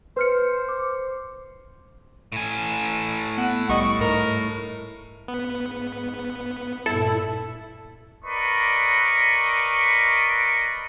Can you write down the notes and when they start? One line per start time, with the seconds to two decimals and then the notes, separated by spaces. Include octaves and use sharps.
0.17 B4 C5 F6 C#7
0.69 D6
2.32 A2 G#5
3.38 B3 F#5
3.69 C2 G3 D#5 C#6
4.01 G#2 A#4
5.28 G#2 B3
6.86 G2 A#2 E4 A4
8.25 A#4 B4 D5 D#5 C#6